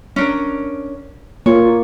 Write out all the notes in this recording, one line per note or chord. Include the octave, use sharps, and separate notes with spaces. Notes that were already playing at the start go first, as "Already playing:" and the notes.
C#4 D4 A#4
A#3 F4 C#5